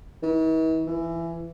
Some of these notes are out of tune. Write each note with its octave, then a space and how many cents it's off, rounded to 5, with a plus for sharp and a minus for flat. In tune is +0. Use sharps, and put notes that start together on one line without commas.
E3 -45
E3 +20